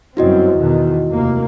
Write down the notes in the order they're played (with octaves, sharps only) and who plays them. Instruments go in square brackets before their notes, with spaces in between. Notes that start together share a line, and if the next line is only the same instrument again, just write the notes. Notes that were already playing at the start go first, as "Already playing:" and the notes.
[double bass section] G1 F#2 C4 [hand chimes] E4 F#4 D#5
[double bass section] E2 B2 D#3
F1 D#2 A#3